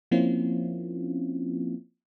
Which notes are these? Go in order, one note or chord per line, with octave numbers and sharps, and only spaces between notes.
F3 A#3 C4 C#4 E4 F4